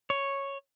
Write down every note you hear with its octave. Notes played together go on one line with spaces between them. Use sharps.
C#5